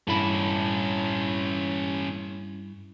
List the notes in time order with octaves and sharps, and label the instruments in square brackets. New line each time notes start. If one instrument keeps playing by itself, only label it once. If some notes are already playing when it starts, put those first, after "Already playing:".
[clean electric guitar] G2 E4 B5 [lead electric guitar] C#4 A4